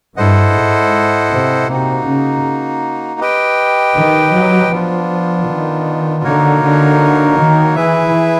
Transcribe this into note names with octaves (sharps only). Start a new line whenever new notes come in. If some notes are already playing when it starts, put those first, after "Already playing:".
G2 E4 A4 C5 D#5 F#5
G#2
C3
C3 A#3 D#4 F#4
C#3
G4 B4 D#5 G5
D#3
F#3
F3 B3 D4 F4
D#3
D3 A#3 D#4 F#4 A#4 C#5
D3
D#3
E3 E4 G#4 B4 E5